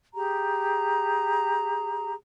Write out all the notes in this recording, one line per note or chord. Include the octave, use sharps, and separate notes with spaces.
G4 G#4 A#5